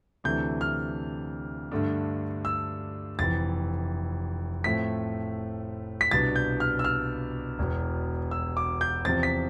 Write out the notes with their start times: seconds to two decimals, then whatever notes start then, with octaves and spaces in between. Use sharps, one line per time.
0.24 D2 C3 E3 A3 D4 G6
0.61 F6
1.72 G2 D3 A3 D4
2.45 E6
3.19 F1 F2 E3 A6
4.64 A2 F3 A3 C4 B6
6.01 B6
6.11 C2 B2 B3 D4 A6
6.36 G6
6.60 F6
6.79 E6
6.84 F6
7.59 E1 E2 B2 B3
8.31 E6
8.57 D6
8.81 G6
9.05 E2 C3 F3 C4 A6
9.23 B6